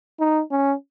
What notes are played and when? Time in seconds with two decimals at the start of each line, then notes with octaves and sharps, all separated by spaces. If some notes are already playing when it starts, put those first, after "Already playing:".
0.20 D#4
0.51 C#4